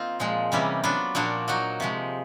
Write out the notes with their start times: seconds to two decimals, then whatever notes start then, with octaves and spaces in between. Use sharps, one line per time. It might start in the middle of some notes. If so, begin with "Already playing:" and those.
Already playing: A#3 C4 D#4 F4
0.20 A#2 F3 G#3
0.52 C3 E3 G3 A#3 C#4
0.84 F#3 B3 D4 F4
1.15 A#2 F3 A#3 D4 F#4
1.48 F#3 A#3 D#4 F#4
1.80 C3 F3 G#3